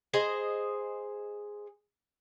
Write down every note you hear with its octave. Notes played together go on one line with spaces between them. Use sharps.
G#4 C5 D#5